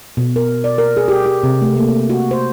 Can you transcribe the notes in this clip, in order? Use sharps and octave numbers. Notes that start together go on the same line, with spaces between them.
B2
A#4
D5
A#4
G#4
G4
G4
C3
A3
A#3
F#4
C5